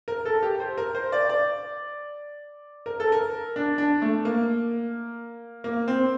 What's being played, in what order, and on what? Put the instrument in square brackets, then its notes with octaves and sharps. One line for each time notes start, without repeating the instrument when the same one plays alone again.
[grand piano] A#4
A4
G4
C5
A#4
C5
D5
D5
A#4
A4
A#4
D4
D4
A3
A#3
A#3
C4